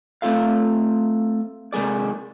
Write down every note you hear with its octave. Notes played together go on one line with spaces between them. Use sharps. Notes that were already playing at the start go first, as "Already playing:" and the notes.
A3 C4 F4 A4 F5
C3 G#3 A#3 G#4 D5